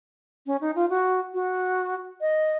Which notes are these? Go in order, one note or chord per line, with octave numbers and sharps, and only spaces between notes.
C#4
D#4
F4
F#4
F#4
D#5